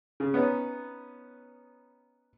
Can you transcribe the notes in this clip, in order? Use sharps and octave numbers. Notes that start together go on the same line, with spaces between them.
C#3
B3 C#4 D#4